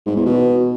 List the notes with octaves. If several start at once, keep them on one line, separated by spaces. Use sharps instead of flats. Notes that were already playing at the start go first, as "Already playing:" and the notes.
G#2
E2
B2